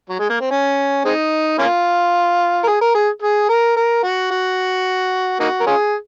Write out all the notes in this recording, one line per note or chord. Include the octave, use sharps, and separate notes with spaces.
F#3
G#3
A#3
C4
C#4
G#3 C4 D#4
A#3 C#4 F4
A#4
G#4
A#4
G#4
G#4
A#4
A#4
F#4
F#4
A#3 D#4 F#4
A#4
C#4 F4 G#4